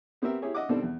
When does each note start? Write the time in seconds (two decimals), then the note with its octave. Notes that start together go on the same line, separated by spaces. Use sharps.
0.22 B3 C4 G4 A#4 E5
0.42 E4 G4 G#4 C#5
0.55 D#5 E5 F#5 D6
0.69 B2 D#3 G3 C4 D4 A4
0.83 E2